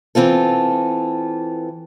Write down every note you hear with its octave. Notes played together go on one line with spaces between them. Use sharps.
E3 C4 F4 A4